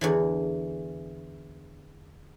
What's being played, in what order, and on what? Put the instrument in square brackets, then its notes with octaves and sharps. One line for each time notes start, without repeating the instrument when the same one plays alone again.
[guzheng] E2 D3 E3